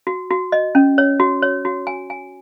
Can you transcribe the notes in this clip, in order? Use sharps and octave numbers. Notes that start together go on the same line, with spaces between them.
F#4
F#4
D#5
C#4
C#5
F#4
C#5
F#4
G#5
G#5